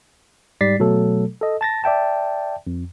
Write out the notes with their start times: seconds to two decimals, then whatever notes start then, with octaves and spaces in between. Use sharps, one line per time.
0.61 G#2 G3 D5 A6 B6 C7
0.79 B2 F#3 A3 A4
1.41 A4 D#5
1.61 A5 A6 A#6
1.84 D5 E5 G5 A5
2.67 F2